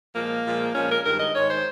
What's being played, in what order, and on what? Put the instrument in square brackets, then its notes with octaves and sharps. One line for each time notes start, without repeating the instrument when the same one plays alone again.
[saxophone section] A#2 F3 G#3 A#3
A#2 F3 G#3
A#2 F3 G#3 C#4
A#4
G2 D#3 G#3 A#4
D#5
G#2 D#3 G#3 C#5
C5